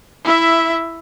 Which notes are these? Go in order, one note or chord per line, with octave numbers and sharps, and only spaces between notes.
E4 E5